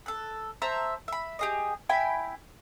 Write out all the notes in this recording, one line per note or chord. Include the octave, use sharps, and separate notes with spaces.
A4 F#6
C5 E5 A5 A#5
E5 B5
G4 G#4 D#5
E4 G5 G#5 B5